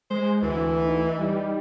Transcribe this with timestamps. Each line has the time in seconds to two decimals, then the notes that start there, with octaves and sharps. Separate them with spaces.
0.10 G#3 C5
0.42 D2 E3
0.86 D#4
1.18 G3